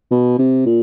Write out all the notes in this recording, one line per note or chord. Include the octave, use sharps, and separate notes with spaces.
B2
C3
A#2